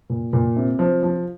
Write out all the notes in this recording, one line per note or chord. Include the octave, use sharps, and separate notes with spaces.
A#2
A#2
C3
F3
F3